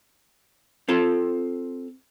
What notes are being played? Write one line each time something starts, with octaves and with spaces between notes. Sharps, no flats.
C4 F4 A4 A5